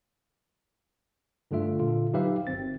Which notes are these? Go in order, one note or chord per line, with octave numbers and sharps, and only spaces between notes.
G2 D3 A3 F4 E5
A#2 D3 F4
F#3 D#4 G4 B4 E5 F5
G1 C4 A6